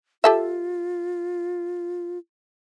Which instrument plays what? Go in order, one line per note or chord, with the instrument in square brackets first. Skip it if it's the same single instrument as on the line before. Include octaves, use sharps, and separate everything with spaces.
[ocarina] F4 [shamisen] G4 A4 E5